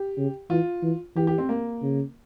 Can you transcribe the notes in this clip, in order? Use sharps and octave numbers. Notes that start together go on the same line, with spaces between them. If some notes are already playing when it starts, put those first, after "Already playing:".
Already playing: G4
C#3
E3 F4
E3
E3 G4
G4
C4
A#3
C#3